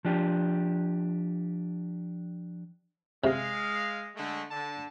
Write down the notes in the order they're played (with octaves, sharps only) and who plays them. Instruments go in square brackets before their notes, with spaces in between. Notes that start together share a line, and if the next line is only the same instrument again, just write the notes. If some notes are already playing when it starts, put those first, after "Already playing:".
[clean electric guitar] F3 D4 G4
[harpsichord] C3 [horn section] G#3 F5
[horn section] D3 G#3 A3
D3 A5